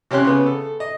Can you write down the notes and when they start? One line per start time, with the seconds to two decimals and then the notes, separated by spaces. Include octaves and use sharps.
0.11 C3 C#4 G4 C#5 C6 F#6
0.25 C#3 B3
0.46 A4
0.80 D#5